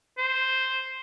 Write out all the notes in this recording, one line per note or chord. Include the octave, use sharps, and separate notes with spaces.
C5